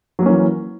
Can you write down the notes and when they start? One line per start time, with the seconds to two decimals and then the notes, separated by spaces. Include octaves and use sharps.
0.19 F#3
0.22 A#3
0.26 C#4
0.29 E3